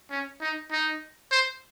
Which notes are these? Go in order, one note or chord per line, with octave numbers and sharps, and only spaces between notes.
C#4
D#4
D#4
C5